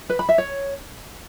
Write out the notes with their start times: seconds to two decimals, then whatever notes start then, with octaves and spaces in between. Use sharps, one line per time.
0.10 B4
0.19 B5
0.29 E5
0.38 C#5